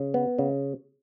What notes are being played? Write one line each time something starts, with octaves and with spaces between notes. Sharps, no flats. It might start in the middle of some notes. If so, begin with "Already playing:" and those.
Already playing: C#3
B3
C#3